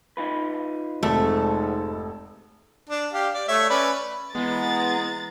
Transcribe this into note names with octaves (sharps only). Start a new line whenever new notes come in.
D#4 F4 B4
F1 G#2 A3 A4
D4
G4 F5
D5
A3 C#5 E5
C#4 B4 D5
E3 G#3 B3 A#5 A6